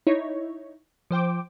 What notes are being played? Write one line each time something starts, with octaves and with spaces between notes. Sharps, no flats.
D#4 E4 C#5
F3 C5 G5 D6